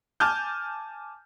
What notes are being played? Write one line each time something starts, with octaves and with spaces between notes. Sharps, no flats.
G#5 A5 D6 F6 G6